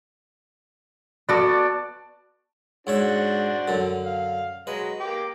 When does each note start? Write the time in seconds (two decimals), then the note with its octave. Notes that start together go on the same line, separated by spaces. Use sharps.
1.29 B3 F#4 A4 D5
2.87 G#2 D4 F#4 C5 C#5 E5
3.68 F#2 D3
4.05 F5
4.67 F#3 G#3 B4
5.00 A#3 G4 D6